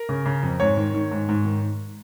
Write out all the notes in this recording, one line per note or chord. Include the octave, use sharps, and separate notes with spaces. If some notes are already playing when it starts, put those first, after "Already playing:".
Already playing: A#4
C#3
C#3
F2
G#2 C#5
D#3
D#3
G#2
G#2
D#3